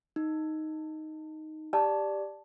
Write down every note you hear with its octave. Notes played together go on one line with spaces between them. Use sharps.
D#4
G4 D5 A5